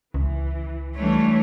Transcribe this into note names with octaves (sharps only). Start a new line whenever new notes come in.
C#2 E3
E3 G3 A3 D4 C#5